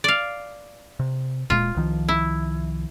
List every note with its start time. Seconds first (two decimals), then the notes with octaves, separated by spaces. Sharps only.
0.04 D5 F5
1.00 C3
1.50 D1 A#2 G#3 F4
1.76 C2 D#3 F3
2.08 E4